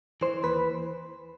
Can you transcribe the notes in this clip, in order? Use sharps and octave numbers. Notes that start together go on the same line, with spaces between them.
E3 C5
D#2 B4